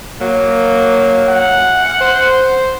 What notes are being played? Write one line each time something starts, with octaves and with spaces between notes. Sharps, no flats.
F#3 A#3
F#5
C5